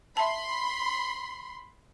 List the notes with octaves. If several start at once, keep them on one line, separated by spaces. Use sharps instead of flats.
E5 A5 B5 C6